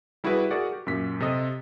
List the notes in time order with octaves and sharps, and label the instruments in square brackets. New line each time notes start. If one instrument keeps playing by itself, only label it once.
[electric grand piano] G3 E4 F#4 G#4 B4 E5
F#4 G#4 A#4 D5 F#5
G4
F#2 A#2 B6
C3 A4 D#5 D#6